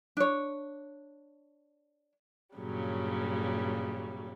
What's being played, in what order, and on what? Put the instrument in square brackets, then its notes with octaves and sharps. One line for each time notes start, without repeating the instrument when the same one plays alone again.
[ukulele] D4 C#5
[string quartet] G2 A#2 C#3 F#3 G3